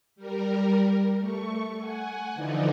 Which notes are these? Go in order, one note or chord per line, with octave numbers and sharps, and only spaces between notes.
G3 A#4
A3 C#6
F#5 G#5
D3 E3 F3 D4 D#4